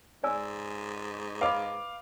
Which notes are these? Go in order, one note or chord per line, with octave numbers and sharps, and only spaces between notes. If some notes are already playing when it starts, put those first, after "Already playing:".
G#2 D5 G#5 E6
B4 D#5 F5 B5 D6